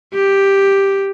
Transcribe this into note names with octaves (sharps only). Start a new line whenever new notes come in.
G4